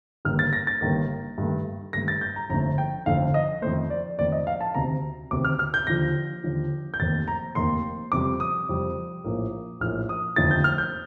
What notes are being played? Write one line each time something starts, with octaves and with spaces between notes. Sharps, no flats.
G1 G2 D#3 A#3 F6
A6
A#6
A6
G1 G2 D#3 A#3
G2 D#3 A3
G2 D#3 A3 A#6
A6
G6
A#5
G1 F2 D3 A3 A#5
G5
G1 F2 D3 A3 F5
D#5
F2 D#3 A3 C5
D5
F2 D#3 A3 D5
D#5
F5
A5
D2 C3 D#3 A#5
D2 C3 D#3 D6
F6
F6
G6
D#2 D3 F3 A#6
D#2 D3 F3
G6
F1 D#2 D#3 A#3 A6
A#5
F1 D#2 D#3 A#3 C6
F2 C3 G3 D6
D#6
F2 C3 G3
A#1 A2 F3 A#3
A#1 A2 F3 A#3 F6
D#6
F1 D#2 D3 F3 A3 A6
G6
F6
G6